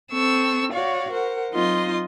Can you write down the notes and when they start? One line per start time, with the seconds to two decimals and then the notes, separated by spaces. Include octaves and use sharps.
0.11 C4 A4 C#6 E6
0.72 F#4 C#5 D5 F5
1.12 A#4 C5 F#5
1.52 F#3 C4 D#4 F4 D#5 C6